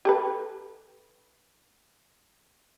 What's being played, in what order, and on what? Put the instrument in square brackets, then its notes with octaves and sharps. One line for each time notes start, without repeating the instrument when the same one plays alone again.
[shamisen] G4 A4 B4